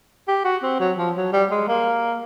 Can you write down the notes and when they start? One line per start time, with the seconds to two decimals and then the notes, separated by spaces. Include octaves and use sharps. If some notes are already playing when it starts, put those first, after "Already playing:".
0.28 G4
0.44 F#4
0.63 C4
0.80 F#3
0.98 F3
1.16 F#3
1.33 G3
1.51 G#3
1.68 A#3